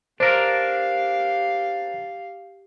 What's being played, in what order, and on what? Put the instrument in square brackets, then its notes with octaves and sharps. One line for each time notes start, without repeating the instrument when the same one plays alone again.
[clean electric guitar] D4 A#4 [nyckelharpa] G4 F5 [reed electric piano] C5